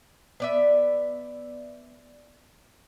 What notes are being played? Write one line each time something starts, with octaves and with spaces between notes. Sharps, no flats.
B3 D5 E5